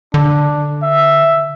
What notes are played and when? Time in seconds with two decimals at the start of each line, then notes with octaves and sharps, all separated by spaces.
0.14 D3 D4
0.83 E5